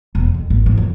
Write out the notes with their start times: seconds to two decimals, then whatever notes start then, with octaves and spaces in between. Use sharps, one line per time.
0.15 E1
0.34 F2
0.50 G#1
0.66 E3 D#4
0.78 F2